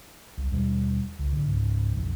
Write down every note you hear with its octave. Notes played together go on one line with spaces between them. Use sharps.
C2
D#2 B2 G3
C#2
A2 D3
C#2 G#2
B1 F2